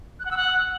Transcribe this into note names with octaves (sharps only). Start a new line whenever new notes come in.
F#6
F#5
E6
F#5